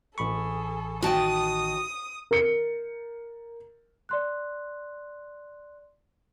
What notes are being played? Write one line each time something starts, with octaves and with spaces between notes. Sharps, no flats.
A1 G#4 A4 B5 C#6
D#3 F#4 G5 A5 D#6
A#4 C#7
D5 C6 F#6